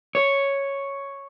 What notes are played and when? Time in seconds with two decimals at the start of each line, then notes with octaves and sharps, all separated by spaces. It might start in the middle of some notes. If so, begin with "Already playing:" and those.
0.15 C#5